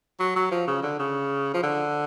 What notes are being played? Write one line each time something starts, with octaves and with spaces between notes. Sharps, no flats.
F#3
F#3
F3
C#3
D3
C#3
F3
D3